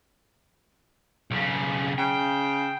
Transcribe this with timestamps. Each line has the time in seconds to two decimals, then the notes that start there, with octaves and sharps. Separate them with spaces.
1.31 B1 C#3
1.98 C#3 G5